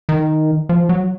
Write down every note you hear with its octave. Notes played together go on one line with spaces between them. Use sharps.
D#3
F3
F#3